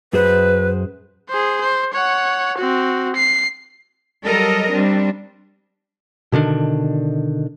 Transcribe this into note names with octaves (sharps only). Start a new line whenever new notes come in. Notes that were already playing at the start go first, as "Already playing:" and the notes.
F#2 G#4 B4 C5
G#4 C5
C5
C#5 F#5
C4 F#4
C7
F#3 G3 A4 A#4 D#5
G3 C4 D4
B2 D3 D#3 D4